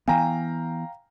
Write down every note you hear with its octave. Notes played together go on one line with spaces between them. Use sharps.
E3 B3 F5 G5 G#5 A#5